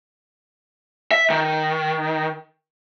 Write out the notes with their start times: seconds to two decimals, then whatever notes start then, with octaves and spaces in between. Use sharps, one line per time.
1.11 E5
1.30 D#3